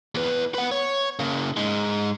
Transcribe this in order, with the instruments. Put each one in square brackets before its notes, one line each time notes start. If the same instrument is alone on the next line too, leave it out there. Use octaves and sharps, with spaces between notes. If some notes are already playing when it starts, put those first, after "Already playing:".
[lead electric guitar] E2 B4
B4 F#5
C#5
C#3 A#3
G#2 G#3